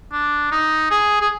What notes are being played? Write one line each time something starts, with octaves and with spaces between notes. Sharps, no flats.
D4
D#4
G#4
G#4